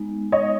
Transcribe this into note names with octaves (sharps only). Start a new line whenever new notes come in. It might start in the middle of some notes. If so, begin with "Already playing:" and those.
Already playing: G#3 B3 D#4
C#5 D#5